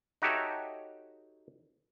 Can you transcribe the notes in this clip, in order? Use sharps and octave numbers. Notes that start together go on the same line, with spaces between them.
D#4 F#4 G4 A4 C#5 E5